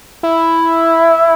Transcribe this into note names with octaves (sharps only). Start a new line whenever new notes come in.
E4